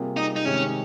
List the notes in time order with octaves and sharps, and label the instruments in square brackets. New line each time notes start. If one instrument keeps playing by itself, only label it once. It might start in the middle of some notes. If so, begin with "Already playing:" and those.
Already playing: [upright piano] C3 G3 A#3 F4 G#4
[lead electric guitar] D#4
D#4
[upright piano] C3 D#3 G#3 [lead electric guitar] C#4